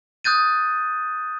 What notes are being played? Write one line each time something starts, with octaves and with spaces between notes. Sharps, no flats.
D#6 F#6 G6 A6 D#7